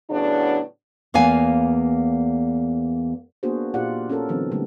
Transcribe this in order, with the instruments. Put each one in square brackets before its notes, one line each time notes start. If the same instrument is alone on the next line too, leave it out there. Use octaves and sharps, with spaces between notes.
[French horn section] A2 C#3 F#3 B3 D4
[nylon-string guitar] E2 A#3 B3 F5 G#5
[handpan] A#3 B3 D4 F#4 G#4 C5
A#2 D#4 F4 G4 D5 F#5
C#4 F4 A4 A#4
D3 E3 F#3 B3 C4
D3 G3 A3 A#3